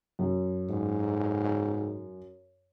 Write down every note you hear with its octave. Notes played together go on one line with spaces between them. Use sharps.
F#2
G#2